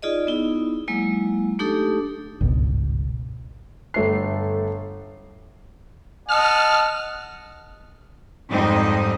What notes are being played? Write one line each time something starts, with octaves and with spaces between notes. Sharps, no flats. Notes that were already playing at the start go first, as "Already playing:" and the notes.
D#4 F4 G#4 D5 D#5
B3 D#4 E4
F#3 G#3 A#3 E4
A3 D4 D#4 G4 A4
G1 C#2 G#2 B2
G1 A3 C7
D#5 F#5 A5 F6
F2 G#2 G3 C4 D#4 D#5